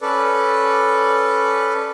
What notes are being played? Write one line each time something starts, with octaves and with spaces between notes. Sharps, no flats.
C#4 A4 B4 D5